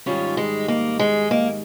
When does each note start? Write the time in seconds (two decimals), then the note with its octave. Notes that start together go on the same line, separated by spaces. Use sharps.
0.06 G#2 D#3 G3 C#4 F4
0.37 G#3
0.68 A#3
0.99 G#3
1.31 A#3